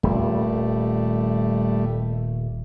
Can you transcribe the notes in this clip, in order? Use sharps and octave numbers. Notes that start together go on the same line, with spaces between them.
D#1 G3 A3